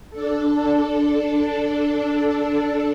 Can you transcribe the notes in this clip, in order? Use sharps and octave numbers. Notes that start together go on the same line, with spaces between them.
D4 A4